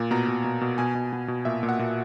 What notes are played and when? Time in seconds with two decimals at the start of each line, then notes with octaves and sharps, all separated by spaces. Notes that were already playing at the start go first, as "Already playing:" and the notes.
Already playing: A#2
0.11 B2 A#5
0.28 B2
0.44 B2
0.61 B2
0.78 B2 G#5
0.95 B2
1.13 B2
1.28 B2
1.45 A#2 E5
1.63 A#2
1.69 F#5
1.79 A#2